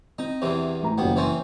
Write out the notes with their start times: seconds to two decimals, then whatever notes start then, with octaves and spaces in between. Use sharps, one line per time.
0.19 C4 D#4
0.42 E2 C3 E3
0.83 A1 A#5
0.98 F#1 D#2 B3 G5
1.16 E3 C4 C#4